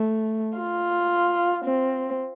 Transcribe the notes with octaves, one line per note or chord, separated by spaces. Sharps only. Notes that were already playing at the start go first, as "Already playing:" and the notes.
Already playing: A3
F4
C4